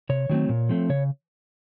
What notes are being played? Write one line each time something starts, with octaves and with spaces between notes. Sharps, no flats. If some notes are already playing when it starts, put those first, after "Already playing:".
C3 C#5
D#3 F#3 A3 C4
A#2
F3 A3 C4
C#3 C#5